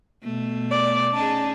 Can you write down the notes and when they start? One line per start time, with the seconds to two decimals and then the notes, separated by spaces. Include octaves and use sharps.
0.23 B2 A3
0.71 D5
1.14 C#4 D#4 G#4 A5